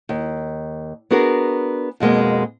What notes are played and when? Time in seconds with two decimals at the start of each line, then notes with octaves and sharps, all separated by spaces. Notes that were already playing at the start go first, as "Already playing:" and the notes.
0.09 D#2
1.11 B3 D4 F#4 G#4 A#4
2.00 F2 B2 G#3 A#3